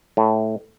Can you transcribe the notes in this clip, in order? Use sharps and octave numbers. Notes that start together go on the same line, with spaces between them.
A2